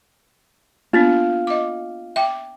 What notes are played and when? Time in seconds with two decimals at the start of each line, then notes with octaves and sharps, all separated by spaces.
0.93 A#3 B3 D4 F4
1.47 D#5 D6
2.16 E5 G5 D6